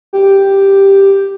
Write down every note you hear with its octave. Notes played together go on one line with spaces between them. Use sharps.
G4